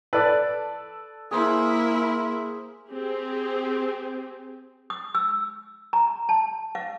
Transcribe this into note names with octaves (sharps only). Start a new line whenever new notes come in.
A4 B4 D5
A#3 E4 G#4 C5
C4 G4 G#4
D#6
E6
A#5
A5
F5